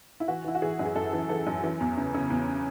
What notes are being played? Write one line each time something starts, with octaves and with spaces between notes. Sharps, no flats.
E4
E3 F#4
E3 E4
F#4
E3 G#4
F#2
G#4
F#2 A4
E3
E3 A4
F#2
E3
E2
C#3
C#3
E2